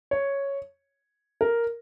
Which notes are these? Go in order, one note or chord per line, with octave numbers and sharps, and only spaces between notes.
C#5
A#4